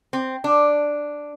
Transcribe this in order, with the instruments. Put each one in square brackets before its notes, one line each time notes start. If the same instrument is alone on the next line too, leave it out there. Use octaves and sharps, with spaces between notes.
[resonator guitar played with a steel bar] C4
D4